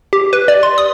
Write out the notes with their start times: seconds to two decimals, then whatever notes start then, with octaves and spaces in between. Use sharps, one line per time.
0.13 G4
0.33 B4
0.48 D5
0.63 C6
0.78 D#6